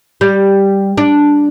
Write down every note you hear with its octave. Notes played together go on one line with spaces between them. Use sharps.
G3
D4